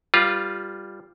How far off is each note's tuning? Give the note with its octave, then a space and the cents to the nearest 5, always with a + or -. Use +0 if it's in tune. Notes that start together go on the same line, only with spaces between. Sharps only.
G3 +0 F4 +0 B4 -30